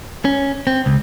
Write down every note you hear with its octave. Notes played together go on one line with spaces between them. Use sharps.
C#4
C4
C#2